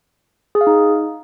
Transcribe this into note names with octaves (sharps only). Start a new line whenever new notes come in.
G#4
F5
D#4